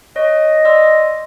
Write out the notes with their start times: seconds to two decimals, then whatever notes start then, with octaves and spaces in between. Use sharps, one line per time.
0.16 C#5 D#5
0.65 D5 C6 E6